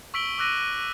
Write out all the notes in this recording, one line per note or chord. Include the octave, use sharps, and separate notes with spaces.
C#6 E6 B6 D7 F#7 G7
D6 E6 F#6 A#6 D#7